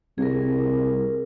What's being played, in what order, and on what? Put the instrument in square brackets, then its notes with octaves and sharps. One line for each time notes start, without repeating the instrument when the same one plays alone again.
[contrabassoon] C2 [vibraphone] G#4 A#4